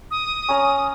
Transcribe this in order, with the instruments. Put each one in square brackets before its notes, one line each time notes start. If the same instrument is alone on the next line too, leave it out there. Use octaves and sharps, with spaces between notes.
[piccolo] D#6
[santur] C#4 A#5